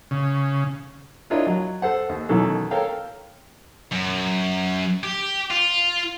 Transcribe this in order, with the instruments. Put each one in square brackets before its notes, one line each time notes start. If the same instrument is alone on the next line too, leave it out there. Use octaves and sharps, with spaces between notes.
[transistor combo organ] C#3
[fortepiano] D4 E4 F4 A#4 C#5 D#5
F#3
A4 C5 F#5
D#2
B2 D#3 E3 F#3 C#4 A4
A4 A#4 C#5 F5 G5
[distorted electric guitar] F#2
G4
F4